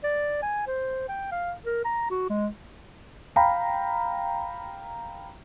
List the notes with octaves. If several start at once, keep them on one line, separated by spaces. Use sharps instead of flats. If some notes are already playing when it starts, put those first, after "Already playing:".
D5
G#5
C5
G5
F5
A#4
A#5
F#4
G#3
F5 G5 A#5 B5